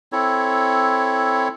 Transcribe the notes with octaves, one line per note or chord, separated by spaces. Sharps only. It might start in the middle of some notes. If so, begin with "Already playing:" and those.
C4 E4 A4 C#5